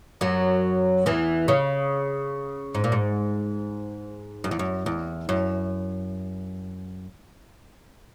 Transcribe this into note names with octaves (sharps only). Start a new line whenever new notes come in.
F#2 F#3
E2 E3
C#3
G#2
A#2
G#2
F#2
E2
F#2
E2
F#2